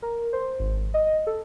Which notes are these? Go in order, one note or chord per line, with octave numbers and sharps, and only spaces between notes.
A#4
C5
G#1
D#5
A4